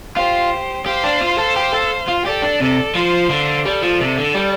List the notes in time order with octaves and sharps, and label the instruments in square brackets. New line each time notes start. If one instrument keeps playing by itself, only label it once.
[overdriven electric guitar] F4 [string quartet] G4 C5
[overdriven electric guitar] G4 [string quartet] C5 F5
[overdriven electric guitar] D4
F4
A4
G4
A4
F4
[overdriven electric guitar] G4 [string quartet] A4 D5
[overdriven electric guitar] D4
[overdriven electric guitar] C3 [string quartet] A4 D5
[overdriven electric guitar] F3 [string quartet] C5 F5
[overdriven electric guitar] D3
[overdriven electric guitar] G3 [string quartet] A4 D5
[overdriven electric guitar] F3
C3
D3
G3